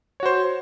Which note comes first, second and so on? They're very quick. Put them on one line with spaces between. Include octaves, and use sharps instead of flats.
C#5 F#4 C5